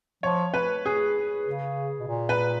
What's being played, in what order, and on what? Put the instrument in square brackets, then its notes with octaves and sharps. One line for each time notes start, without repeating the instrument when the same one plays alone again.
[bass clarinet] F3 [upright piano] C#5
[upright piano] B4
G#4
[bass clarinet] C#3
B2
A#2
[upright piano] B4